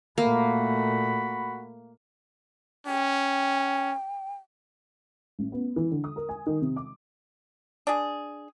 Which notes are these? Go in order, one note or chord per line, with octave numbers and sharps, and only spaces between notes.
A#2 A3 A#3 F#4 B5
C#4 G5
A1
B3
E3
D3
D#6
A#4
G#5
D#3
C3
D6
D4 G#4